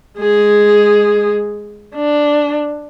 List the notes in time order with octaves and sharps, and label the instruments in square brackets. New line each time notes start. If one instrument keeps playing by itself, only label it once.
[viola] G#3 G#4
D4